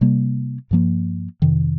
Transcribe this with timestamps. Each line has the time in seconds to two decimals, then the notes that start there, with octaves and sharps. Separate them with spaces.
0.01 C3 G3 A#3
0.71 G2 F3 A#3
1.42 F2 C3 D#3